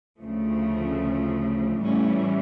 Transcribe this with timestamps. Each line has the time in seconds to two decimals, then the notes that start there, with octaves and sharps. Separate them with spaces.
0.20 D2 C#3 F3 A3
1.83 A2 E3 G3 A3 C#4